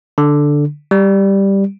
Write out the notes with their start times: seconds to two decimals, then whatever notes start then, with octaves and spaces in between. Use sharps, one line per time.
0.18 D3
0.91 G3